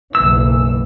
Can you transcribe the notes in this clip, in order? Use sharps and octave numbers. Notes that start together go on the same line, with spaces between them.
F#1 B1 E3 E6